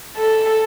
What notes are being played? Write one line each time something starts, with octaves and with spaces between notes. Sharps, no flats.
A4